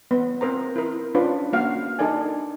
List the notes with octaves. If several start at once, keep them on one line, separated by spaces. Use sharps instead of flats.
B3
C4 A#4 C5 A#5
E4 A#4
C#4 D4 F4 B4 C5
A#3 C#4 F#4 F5
D4 D#4 A4 A#4 D5 G#5